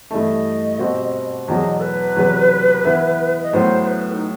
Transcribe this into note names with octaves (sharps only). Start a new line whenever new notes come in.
G2 E3 A3 D#5
B2 G3 C4 F#4
E2 B2 F#3 D#5
A4
B4
E2 C3 F#3
E3 B3 E4
D#5
A2 F#3 B3 C5
B4
D#4